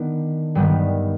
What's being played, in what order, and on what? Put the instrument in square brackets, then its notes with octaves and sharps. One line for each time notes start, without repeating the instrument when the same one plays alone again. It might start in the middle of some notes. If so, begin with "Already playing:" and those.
Already playing: [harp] D#3 B3 D4
G2 D#3 G3 B3